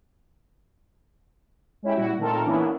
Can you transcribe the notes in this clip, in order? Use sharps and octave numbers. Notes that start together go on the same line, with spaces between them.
G#3 C#4 E4 G4
A#2 G3 E4 F#4
A#2 D#3 A3 C4 A4 A#4
E3 A#3 B3 C#4 D4 E4